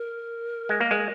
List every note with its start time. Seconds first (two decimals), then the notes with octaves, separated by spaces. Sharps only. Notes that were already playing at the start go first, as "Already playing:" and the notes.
Already playing: A#4
0.69 G#3
0.80 A#3
0.91 G#3